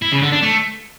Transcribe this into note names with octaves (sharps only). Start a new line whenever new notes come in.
E4
C#3
D3
D4
A3